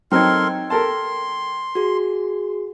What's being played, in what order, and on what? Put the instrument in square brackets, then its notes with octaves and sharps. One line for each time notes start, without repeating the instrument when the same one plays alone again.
[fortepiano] F#3 C4 D#4 [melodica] A4 A#4 C6 [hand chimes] G5 G#6
[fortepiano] A4 A#4 A5 [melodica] C6
[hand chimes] F#4 G#4